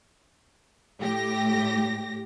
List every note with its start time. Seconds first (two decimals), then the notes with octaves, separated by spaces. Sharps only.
1.00 A2 G4 A#6